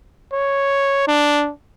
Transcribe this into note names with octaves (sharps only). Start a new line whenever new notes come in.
C#5
D4